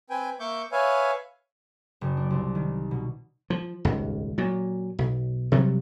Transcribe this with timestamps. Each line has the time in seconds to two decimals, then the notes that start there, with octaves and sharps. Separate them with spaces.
0.10 C4 B4 G5 G#5
0.40 A#3 E5 C#6 D6 G6
0.72 B4 C#5 E5 F5 G#5
2.01 F#1
2.17 D4
2.30 C2
2.55 D#3
2.91 B2
3.50 F3
3.85 D#1 G#1 C#2
4.38 A#2 F#3
4.99 B1
5.52 C3 F#3 G3